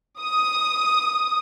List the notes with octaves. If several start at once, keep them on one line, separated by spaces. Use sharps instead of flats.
D#6